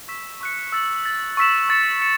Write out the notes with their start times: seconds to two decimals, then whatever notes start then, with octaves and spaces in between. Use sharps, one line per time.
0.08 C#6 E6 B6 E7
0.41 C#6 F#6 C#7
0.72 E6 A6 C#7 F#7
1.05 A6 F#7
1.37 C#6 E6 B6 E7
1.69 C#6 A6 C#7 E7
2.02 C#7 E7